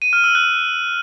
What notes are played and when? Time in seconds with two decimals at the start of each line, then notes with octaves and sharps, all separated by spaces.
0.02 D#7
0.13 F6
0.24 E6
0.35 F#6